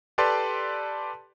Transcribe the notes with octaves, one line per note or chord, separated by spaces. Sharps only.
G4 A4 B4 D5 A5 C6